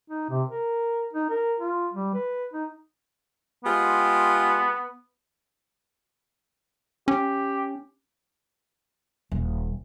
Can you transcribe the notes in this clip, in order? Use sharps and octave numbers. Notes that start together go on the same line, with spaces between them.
D#4
C3
A#4
D#4
A#4
F4
G3
B4
D#4
G#3 B3 F4 G4
C#4 G4
D#1